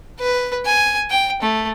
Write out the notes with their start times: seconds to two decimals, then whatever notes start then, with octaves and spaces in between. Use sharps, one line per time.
0.20 B4
0.66 G#5
1.11 G5
1.42 A3